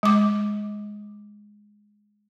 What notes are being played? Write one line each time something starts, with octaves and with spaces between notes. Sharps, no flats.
G#3 D6